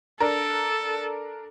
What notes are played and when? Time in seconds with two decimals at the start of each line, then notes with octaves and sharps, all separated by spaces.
0.20 D4 A4 A#4